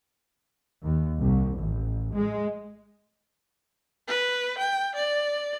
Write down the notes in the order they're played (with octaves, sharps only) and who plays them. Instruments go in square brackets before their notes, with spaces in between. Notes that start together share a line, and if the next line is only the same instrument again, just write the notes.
[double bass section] D#2
C2
A1
G#3
[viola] B4
G5
D5